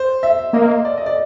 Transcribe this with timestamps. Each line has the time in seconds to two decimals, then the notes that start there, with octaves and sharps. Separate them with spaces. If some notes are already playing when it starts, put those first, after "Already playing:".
Already playing: C5
0.23 E5
0.53 A#3 D#5
0.85 D5
0.98 D#5
1.06 D5